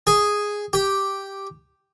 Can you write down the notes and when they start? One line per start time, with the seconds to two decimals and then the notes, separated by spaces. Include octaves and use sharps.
0.07 G#4
0.73 G4